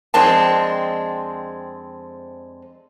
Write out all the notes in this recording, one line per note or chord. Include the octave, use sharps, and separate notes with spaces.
F2 G#3 C4 D4 A5